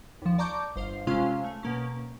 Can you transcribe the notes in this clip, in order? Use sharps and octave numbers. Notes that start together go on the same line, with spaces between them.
D#2 F3
D5 A5 A#5 C#6 D6 G6
G1 C5 F5 C7
C3 G#3 C#4 F4 F5 C6
A3
B2 A#3 C#4